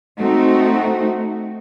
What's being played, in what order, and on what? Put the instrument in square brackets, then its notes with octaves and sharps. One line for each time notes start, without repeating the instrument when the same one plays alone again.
[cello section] A3 C4 D#4 F#4